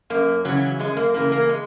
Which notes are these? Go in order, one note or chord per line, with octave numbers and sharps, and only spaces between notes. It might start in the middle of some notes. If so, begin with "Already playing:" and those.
F#2 A#3
C#3 E3 F#3
F#2 G#3
A#3
C#3 E3 A#3
A#3
G#3